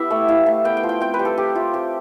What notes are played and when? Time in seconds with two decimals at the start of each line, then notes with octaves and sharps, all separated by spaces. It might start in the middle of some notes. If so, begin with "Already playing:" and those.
Already playing: B3 E4 G4 E5
0.10 A3
0.28 E4 F5
0.46 A3
0.65 B3 G5
0.77 G5
0.83 F3
0.89 G5
1.00 C4 G5
1.14 B4
1.19 G3
1.25 A4
1.38 C4 G4
1.55 A3 F4
1.73 C4 G4